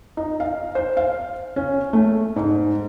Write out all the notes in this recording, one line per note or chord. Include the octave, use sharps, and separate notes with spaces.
D#4
F5
C5
F5
C#4
A3
G#2